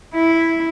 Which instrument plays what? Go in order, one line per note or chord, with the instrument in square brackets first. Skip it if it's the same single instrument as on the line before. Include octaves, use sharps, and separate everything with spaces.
[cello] E4